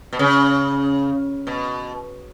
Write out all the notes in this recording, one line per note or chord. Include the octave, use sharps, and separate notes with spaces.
B2
C#3
B2